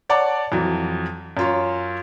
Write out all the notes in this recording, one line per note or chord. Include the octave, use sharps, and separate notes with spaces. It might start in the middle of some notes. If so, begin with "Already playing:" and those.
C#5 D5 F#5 A5 D6
F2 E3 F#3
F#2 F4 C#5